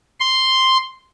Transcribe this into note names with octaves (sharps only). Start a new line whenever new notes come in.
C6